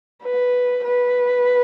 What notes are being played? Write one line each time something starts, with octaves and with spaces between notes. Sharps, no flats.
B4
B4